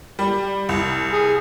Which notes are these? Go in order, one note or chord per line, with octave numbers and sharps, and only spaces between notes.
G3
C2
G#4